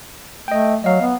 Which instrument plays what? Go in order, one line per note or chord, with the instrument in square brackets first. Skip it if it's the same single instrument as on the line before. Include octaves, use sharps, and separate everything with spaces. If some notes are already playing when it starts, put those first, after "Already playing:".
[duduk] A3 [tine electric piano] D#5 G5
[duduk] F#3 [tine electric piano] D#5 F5
[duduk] B3